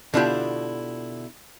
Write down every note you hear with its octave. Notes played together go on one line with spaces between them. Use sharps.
B2 D3 D4 E4 F4 G4